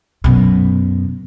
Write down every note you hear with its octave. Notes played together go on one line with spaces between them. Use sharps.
F#2 B2